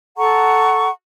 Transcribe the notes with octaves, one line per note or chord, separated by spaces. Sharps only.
A4 F#5 A#5 C#6